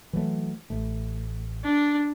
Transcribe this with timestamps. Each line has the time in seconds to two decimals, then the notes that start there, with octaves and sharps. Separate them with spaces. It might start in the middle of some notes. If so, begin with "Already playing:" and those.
0.13 E3 F#3 A3
0.70 A1 A3
1.65 D4